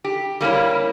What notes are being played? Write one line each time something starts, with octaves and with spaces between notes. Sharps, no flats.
G4
G3 A#3 C#4 E4